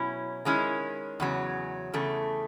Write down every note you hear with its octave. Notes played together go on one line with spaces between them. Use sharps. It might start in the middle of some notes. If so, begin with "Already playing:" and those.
Already playing: B2 F#3 C#4 E4
D#3 G#3 C#4 E4
E2 C#3 F#3
E2 C#3 A3